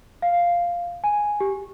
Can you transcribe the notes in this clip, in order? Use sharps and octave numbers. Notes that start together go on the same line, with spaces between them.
F5
G#5
G4